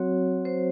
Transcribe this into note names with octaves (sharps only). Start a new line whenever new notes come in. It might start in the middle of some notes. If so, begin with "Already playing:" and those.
Already playing: F#3 C4 F#4 C#5
C5